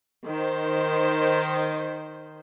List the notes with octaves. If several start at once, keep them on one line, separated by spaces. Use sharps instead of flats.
D#3 C5